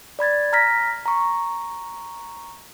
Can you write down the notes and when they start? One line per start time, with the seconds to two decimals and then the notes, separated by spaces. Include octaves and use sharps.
0.19 D5 B5 G#6 A6
0.53 A#5 F6 A#6 B6
1.06 A#5 C#6